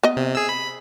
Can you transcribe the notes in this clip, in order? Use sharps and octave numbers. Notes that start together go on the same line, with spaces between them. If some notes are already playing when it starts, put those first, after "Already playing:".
B3 D#5
C3
G#4 E6
B5